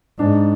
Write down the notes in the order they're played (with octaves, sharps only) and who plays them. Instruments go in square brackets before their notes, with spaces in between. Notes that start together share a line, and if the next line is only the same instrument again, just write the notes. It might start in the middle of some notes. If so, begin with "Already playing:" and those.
[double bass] G#2 [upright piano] D4